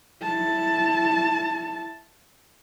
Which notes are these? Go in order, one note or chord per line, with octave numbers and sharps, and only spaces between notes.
E4 A5